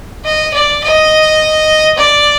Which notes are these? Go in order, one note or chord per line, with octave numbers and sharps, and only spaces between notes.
D#5
D5
D#5
D5